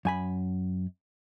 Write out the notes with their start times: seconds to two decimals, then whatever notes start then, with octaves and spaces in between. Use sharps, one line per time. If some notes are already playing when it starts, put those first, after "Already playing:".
0.05 F#2 G#5 B5